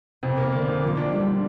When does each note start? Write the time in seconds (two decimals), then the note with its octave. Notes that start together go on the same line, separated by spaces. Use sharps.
0.23 F2 C3
0.38 A#3
0.52 D3 A#3
0.68 F2
0.82 F3 A#3
0.97 D4
1.12 G3 D4
1.27 D3